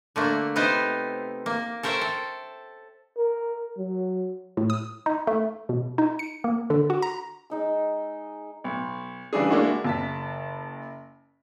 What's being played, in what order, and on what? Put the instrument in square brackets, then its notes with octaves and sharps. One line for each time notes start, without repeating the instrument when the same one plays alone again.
[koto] D3 A3 A#3
C3 B3 D#4 C5
A#3
A4 A#4 C5 C#5 E5 G5
A4
[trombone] A#4
F#3
[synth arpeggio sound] A2
D#6
D#4
A3
B2
D#4
C#7
A#3
D3
F#4
A#5
[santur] G#3 D#4 E6
[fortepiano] B1
C#3 E3 G3 D4 G#4
G#3 A#3 D4 E4 F#4
[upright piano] F#1 A5 B6